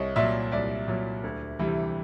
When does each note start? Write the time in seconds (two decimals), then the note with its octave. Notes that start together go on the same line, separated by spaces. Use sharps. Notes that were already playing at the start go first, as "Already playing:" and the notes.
Already playing: C2 C#5 D#5
0.16 A#2 F#3 D5 E5
0.52 C2 D5 E5
0.88 A#2 F#3
1.24 D2
1.59 C3 E3 G3